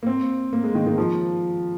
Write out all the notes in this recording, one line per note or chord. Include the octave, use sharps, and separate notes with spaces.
A#3
C4
A#3
G#3
D#3
D#3
F3